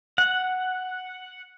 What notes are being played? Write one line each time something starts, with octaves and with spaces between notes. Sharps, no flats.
F#5